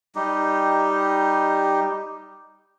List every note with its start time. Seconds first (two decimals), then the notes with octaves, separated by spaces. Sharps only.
0.15 G3 D#4 G4